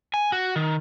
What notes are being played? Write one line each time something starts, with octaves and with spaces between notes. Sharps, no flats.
G#5
F#4
D#3